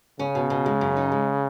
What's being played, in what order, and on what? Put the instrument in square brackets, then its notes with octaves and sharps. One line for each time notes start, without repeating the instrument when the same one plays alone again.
[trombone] C#3 [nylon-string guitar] C#4
[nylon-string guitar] B2
B2
G#3
F#2
D#4
G#3